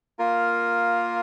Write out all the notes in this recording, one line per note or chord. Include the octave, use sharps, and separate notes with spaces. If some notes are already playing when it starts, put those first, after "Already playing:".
A#3 F4 A#4